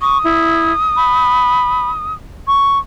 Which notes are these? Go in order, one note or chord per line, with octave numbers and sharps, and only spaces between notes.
C#6 D#6
E4
B5
C#6